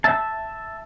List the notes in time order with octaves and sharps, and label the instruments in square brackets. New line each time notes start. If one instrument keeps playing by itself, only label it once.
[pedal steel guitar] E5 A5